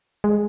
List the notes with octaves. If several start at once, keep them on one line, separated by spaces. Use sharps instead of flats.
G#3